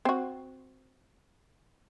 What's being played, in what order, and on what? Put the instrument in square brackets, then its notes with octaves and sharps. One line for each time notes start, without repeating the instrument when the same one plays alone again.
[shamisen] C4 F#4